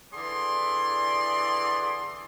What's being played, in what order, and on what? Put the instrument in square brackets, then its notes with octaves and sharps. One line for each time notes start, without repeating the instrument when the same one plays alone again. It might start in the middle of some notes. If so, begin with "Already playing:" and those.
[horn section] D3 E3 G#4 D5 C6